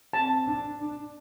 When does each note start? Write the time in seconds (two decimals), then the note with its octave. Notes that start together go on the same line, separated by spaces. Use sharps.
0.13 C4 A5
0.47 D4
0.80 D4